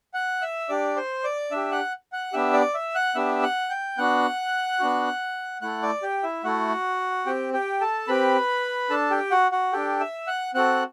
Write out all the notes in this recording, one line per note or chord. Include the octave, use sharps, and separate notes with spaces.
F#5 F#6
E5 E6
D4 G4 D5 D6
C5 C6
D5 D6
D4 G4 E5 E6
F#5 F#6
F#5 F#6
B3 D4 G4 E5 E6
D5 D6
E5 E6
F#5 F#6
B3 D4 G4 E5 E6
F#5 F#6
G5 G6
B3 D4 F#4 F#5 F#6
B3 D4 F#4
A3 E4 A4 F#5 F#6
D5 D6
G4 G5
E4 E5
A3 E4 F#4 A4 F#5
C4 G4 G5
G4 G5
A4 A5
C4 G4 B4 B5
D4 A4 A5
G4 G5
F#4 F#5
F#4 F#5
D4 G4 A4 G5
E5 E6
F#5 F#6
C4 F#4 A4 F#5 F#6